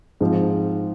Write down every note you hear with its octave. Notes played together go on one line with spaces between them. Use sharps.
G#2 F3 C4